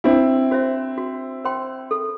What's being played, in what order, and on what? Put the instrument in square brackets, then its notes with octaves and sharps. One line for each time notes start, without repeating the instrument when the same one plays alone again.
[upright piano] C4 E4 [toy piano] D4
[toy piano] F#4 C5 E5
F#4
C5 G5 C6
A4